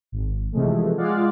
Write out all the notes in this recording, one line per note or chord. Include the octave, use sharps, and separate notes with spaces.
G#1
C3 E3 F3 G#3 A3
G#3 F4 D5 F5 F#5